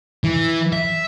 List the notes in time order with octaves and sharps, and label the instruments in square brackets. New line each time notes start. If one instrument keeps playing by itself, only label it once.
[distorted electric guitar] E3
E5